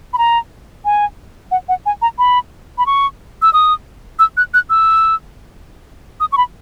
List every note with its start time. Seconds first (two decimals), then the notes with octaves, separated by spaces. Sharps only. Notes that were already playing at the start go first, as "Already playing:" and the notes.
0.13 B5
0.18 A#5
0.85 G#5
1.51 F#5
1.69 F#5
1.86 G#5
2.02 A#5
2.18 B5
2.78 B5
2.86 C#6
3.42 E6
3.53 D#6
4.19 E6
4.37 F#6
4.54 F#6
4.70 E6
6.20 D#6
6.32 C#6
6.38 B5